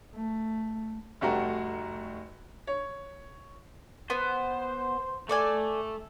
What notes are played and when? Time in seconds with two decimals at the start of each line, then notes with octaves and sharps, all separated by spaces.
0.15 A3
1.21 F1 G3 A3 F#4 G5 A#5
2.67 C#5
4.10 B3 C5
5.29 A3 A4 D5 G#5